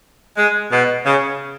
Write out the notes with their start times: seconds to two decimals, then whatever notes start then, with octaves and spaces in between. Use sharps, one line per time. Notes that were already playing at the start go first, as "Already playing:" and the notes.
0.37 G#3
0.71 B2
1.05 C#3